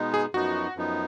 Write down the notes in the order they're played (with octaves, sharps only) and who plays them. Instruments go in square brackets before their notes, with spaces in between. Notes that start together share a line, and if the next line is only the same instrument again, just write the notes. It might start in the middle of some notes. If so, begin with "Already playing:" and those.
Already playing: [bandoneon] B2 G#3 B3 D#4
[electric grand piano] G#4
[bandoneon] F#2 F3 B3 D#4 [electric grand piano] F#4
[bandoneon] F#2 F3 B3 D#4